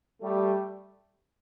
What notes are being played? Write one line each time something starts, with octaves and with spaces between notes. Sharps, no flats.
G3 A3